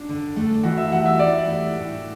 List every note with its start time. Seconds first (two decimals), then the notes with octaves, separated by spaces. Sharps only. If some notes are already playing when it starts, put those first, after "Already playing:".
Already playing: D4
0.09 D3
0.36 A3 D4 A4
0.63 E3 F#4
0.78 E5
0.92 A3 E4 G4 F#5
1.06 E5
1.19 E3 D5
1.46 A3 E4 G4
1.75 A2